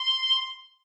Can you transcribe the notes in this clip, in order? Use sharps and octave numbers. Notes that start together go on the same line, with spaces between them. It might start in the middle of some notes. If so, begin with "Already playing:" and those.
Already playing: C6